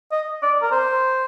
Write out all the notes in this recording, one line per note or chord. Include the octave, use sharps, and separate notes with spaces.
D#5
D5
A#4
C5